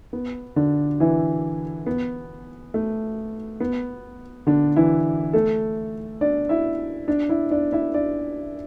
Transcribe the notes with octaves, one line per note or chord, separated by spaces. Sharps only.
B3
D3 D4
E3 E4
B3
A3
B3
D3 D4
E3 E4
A3 A4
D4 D5
E4 E5
D4 D5
E4 E5
D4 D5
E4 E5
D4 D5